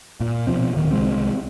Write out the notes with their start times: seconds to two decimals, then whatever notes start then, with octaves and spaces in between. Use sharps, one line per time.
0.20 A#2
0.47 B2 D#3 F3 C4
0.74 D1 D#3
0.91 C2 G2 G#3 C4